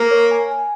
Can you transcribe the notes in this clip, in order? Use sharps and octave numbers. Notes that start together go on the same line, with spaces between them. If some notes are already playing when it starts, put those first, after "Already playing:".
Already playing: A#3
C#5
G#5
G#5